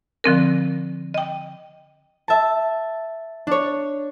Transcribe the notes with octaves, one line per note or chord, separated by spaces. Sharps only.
D3 F3 C4 A#4
D#5 G5
E5 A5
D4 C#5